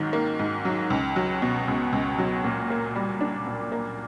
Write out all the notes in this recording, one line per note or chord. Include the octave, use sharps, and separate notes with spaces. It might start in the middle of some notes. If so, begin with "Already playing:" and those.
Already playing: G#2 D#3 F#3
A#3
G#2
F#3
C#2
F#3
B2
C#2
C#2
F#3
A#2
A#3
G3
D4
A#2
A#3